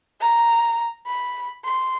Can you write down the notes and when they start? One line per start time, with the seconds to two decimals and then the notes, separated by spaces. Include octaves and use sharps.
0.21 A#5
1.07 B5
1.65 C6